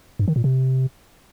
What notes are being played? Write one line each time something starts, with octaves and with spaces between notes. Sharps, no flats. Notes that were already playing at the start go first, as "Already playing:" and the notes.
G2
D#3
A#2
C3